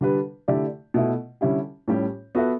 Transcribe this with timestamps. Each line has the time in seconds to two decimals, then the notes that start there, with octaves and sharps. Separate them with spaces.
0.01 D3 G3 D4 G4 B4
0.48 D3 A3 E4 G4 D5
0.94 B2 A3 E4
1.41 D3 G3 C#4 E4 G4
1.88 A2 G3 C#4 G4
2.35 B3 F#4 A4 E5